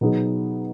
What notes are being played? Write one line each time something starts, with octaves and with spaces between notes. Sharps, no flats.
B2 F#3 B3 D#4 G#4